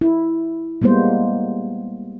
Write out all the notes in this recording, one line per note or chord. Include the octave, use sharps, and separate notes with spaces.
E4
G3 G#3 A#3 B3 C5